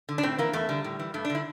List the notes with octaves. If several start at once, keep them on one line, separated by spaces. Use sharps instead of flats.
D3
D4
A2 C4
E3 A#3
E2 A3
D3 G3
A2
E3
G2 A3
D4
D3
E4